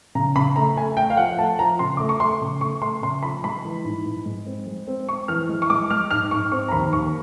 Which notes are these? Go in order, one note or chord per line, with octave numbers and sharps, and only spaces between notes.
C#3 A#5
C#3 B5
A3 A#5
A3 G#5
A3 G5
F5
F3 F#5
A3 A5
F3 A#5
C#3 C6
A3 D6
C#6
A3 C6
C#3
A3 C#6
A3 C6
C#3 C6
F3 B5
G#3 B5
E3
G#2
G#2
G#3
C4
G#3
C4
C4 C#6
E3 F6
G#3
C#6
G#3 D6
G#3 F6
G#2 F6
G#2 C#6
C4 C#6
A#5
D#2 B5
D#2 C#6